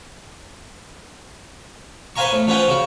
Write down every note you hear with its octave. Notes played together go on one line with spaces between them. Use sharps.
B4 C5 F5 G#5 A#5 C#6
A2
F3 C#4 B4 F#5 G5
C#3 F#4